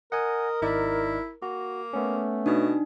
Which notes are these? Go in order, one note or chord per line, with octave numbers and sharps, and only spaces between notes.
A#4 D#5 F#5 G#5
G#1 D#4 E4 D5
A#3 F#4
A3 B3 C#4
B2 D4 D#4